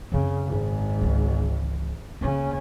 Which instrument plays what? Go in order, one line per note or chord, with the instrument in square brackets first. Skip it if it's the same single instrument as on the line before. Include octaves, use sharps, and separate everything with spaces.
[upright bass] F#2 C4 [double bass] C#3
[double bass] G#1 G#2
[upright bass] C#2 E3
[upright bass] D2 A#3 [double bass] C#3 C#4